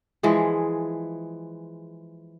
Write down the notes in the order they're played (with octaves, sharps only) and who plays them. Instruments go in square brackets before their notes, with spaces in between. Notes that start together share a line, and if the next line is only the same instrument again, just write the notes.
[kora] E3 F3 G#3 G#4